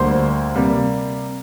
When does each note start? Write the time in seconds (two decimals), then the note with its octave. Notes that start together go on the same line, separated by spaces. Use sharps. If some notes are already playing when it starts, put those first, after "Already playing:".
Already playing: D2 D3 G3 A#3 C5 C6
0.55 C3 G3 A#3